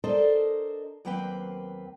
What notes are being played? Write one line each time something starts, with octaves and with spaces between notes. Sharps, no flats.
D4 A4 A#4 C5 D5 D#5
D#2 F#3 A#3 C4 B4 G5